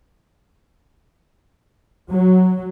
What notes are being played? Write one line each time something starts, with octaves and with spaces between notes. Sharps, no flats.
F#3